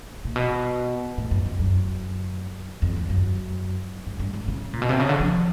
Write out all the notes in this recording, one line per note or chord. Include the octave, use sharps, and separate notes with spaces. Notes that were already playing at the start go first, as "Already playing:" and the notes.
A#2
B2
A2
F#2
F2
F#2
F2
F2
F#2
G2
G2
G#2
C#3
A#2
B2
C3
C#3
D3
F3